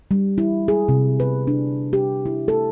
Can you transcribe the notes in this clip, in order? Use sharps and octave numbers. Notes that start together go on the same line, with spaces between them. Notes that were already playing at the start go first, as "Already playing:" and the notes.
G3
E4
G#4
C3
B4
D4
G4
E4
A4